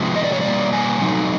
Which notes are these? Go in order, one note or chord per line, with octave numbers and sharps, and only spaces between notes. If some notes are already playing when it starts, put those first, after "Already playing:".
Already playing: C3 F3 G#3 B3
D#5
D5
C#5
B2 G3 A#3 D5
G#5
B2 F#3 A3 C4 D#4